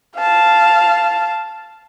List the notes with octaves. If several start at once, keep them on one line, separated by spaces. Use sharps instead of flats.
F5 A5